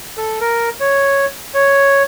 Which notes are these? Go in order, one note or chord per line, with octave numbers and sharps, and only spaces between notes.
A4
A#4
C#5
C#5